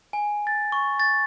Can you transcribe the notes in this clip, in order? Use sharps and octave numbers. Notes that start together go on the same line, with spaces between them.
G#5
A6
C#6
A6